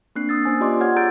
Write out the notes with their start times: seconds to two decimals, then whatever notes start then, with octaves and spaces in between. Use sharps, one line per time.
0.16 A#3 C4 D4 F#6 C7
0.29 D#6 E6 A6
0.45 A#3 C#4 C5 G#5
0.61 F4 G4 D5 D#5 C6 D6
0.80 F4 C#5 F#5 F6 G#6
0.96 G#4 A#5 E6 G6 A6 D7